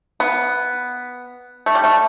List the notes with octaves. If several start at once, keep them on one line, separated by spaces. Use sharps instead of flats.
B3
A3
G3
A3